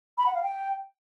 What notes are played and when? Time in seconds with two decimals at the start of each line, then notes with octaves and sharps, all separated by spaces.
0.18 B5
0.26 F#5
0.34 F5
0.43 G5